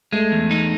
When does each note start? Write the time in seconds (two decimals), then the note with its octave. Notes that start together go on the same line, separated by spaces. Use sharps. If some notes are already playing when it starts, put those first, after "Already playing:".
0.12 G#3 A3
0.32 E2
0.51 D#4